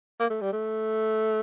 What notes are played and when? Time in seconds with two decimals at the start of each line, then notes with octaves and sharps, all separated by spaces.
0.20 A#3
0.30 A3
0.42 G3
0.53 A3